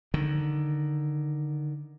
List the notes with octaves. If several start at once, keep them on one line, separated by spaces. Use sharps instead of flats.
D3 D#3